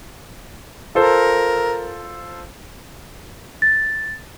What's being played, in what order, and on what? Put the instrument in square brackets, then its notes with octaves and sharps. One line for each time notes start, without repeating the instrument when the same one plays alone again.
[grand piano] F4 A4 C5 [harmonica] A#4
[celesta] A6